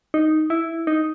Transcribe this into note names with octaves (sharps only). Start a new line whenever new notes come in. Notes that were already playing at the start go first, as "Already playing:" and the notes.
D#4
E4
D#4